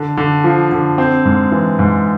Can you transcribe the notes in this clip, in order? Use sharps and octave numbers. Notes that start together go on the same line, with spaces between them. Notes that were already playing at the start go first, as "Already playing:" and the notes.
Already playing: D3
D3
F3
D3
C4
G#2
E3
G#2